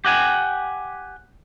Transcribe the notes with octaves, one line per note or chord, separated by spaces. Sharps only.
G4 F#5 G#5